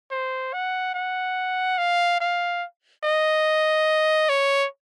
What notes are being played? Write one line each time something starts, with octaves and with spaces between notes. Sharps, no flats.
C5
F#5
F#5
F5
F5
D#5
C#5